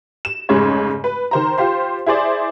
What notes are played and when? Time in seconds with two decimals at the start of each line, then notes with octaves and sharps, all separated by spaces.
0.25 E7
0.49 F1 G#2 C#3 G#3 C#5
1.04 B4
1.31 D#3 C5 A#5
1.58 F4 G4 C5 C6
2.06 E4 G#4 C5 D5